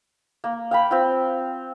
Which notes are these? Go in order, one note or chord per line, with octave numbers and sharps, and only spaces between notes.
A#3
F5 G5 B5
C4 F4